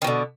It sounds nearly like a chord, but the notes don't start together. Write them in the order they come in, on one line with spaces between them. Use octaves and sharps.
D#3 B2 D3